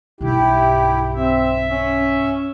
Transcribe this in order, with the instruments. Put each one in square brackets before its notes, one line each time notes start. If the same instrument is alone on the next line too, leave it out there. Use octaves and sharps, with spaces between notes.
[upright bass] B1 G2 [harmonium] E4 G4
[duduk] C4 [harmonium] E5
[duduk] C#4